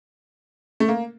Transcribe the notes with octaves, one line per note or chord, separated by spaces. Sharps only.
A3
A#3